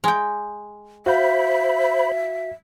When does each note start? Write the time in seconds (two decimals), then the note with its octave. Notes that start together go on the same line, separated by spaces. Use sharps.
0.04 G#3 G5
1.06 F#4 C5 E5 F5 B5 G6